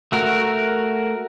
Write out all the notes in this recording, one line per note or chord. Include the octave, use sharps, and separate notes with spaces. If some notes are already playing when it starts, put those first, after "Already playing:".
A3 F#4 A#4